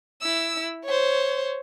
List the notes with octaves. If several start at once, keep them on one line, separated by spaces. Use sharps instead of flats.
E4 E6
C5 C#5